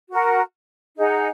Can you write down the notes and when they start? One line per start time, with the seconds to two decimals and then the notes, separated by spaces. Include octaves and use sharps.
0.11 F#4 A#4 F#5
0.97 D#4 G#4 F#5